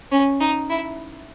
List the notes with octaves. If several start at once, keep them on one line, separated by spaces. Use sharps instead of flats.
C#4
D#4
E4